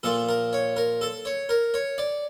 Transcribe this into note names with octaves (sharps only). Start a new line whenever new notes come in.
A#2 F3 A4
A#4
C#5
A#4
A4
C#5
A#4
C#5
D5